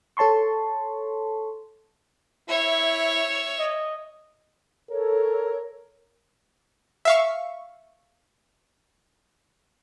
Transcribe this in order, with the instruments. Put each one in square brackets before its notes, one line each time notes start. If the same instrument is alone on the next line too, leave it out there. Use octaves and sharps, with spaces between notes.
[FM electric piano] A4 C#5 A5 C6 C#6
[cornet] E4 [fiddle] C#5 E5
[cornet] D#5
[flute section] A4 C#5 [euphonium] A#4
[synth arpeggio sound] E5 F5 C#6